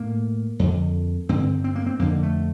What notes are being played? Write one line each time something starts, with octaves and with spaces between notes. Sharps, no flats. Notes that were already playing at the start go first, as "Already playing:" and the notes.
Already playing: A2 A#3
F2 D3
G2 D3 C4
C4
A#3
C4
F2 D3 A#3
A3